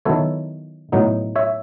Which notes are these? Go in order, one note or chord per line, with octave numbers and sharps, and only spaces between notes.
D#3 F#3 B3 E4 A4 C#5
A2 F#3 B3 D#4
C#5 E5